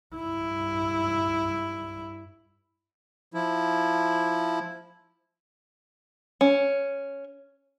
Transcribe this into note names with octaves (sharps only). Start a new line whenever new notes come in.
G2 E4
F3 E4
C#4